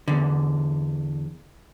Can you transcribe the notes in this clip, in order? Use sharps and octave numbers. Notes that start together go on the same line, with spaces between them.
E2 D3